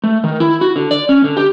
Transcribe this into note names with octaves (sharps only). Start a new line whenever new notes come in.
A3
D#3
E4
F#4
D3
D5
C#4
D3
G4